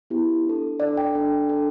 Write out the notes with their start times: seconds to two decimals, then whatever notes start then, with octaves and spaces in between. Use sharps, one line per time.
0.10 B3 E4 G4
0.46 D4 A4
0.80 D4 A4 D5
0.97 G5
1.15 D4 A4
1.49 D4 A4